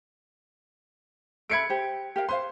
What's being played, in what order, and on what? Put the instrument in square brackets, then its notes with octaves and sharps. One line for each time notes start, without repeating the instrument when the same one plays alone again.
[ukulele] A4 E5 B5 [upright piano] G#6 C#7 D7
[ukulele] G4 C5
G4 A#4 F5
[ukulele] B4 C5 F5 [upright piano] C6